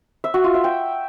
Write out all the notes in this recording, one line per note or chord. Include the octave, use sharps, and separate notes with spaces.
E5
F#4
F4
E5
G5